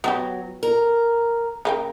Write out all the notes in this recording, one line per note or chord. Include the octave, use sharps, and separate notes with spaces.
F#3 B3 F#4 G4
A#4
C#3 A#3 G5